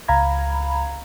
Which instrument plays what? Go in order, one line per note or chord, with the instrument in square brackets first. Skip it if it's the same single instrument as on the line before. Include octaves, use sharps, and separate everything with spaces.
[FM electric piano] C#2 F5 A#5 B5 G#6